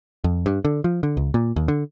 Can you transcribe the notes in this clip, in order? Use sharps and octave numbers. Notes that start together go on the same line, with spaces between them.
F2
G2
D3
F3
D3
C#2
A#2
D#2
D3